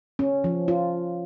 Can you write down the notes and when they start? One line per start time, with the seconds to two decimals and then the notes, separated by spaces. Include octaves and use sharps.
0.19 C#4
0.44 F3
0.68 F4